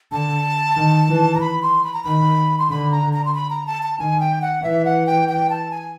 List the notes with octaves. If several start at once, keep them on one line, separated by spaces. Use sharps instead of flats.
D3 A5
D#3
E3
A#5
B5
C6
B5
A#5
D#3 B5
C6
D3 B5
A#5
A#5
C6
B5
A#5
A5
A5
D#3 G#5
G5
F#5
E3 E5
F#5
G5
G5
A5
G#5